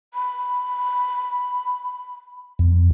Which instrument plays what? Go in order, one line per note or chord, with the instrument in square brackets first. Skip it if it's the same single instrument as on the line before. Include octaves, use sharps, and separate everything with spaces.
[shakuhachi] B5
[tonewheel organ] F2